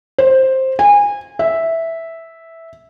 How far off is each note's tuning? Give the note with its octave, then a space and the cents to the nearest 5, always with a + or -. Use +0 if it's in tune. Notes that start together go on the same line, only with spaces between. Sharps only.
C5 +10
G#5 -25
E5 -5